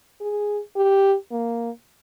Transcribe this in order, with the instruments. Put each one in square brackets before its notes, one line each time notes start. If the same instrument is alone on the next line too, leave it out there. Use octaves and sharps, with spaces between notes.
[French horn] G#4
G4
A#3